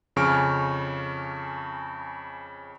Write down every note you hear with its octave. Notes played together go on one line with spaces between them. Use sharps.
F2 C#3 G#5 C#6 F6 D7